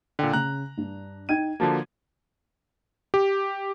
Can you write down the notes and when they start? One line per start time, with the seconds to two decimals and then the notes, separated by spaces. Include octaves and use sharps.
0.19 A#2 D3 G5
0.33 C#3 A#5 F#6
0.77 G2 D4
1.29 D#4 G5 G#6 D#7
1.60 D3 F3 A#3 F#4 A5
3.14 G4